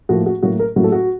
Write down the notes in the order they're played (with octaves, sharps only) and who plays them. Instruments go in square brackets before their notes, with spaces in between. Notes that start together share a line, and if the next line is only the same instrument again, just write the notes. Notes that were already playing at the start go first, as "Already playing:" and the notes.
[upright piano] A2 F3 A#3 F#4
F#4
A2 F#3 A#3 F#4
A#4
A2 F#3 A#3 F#4
A4
F#4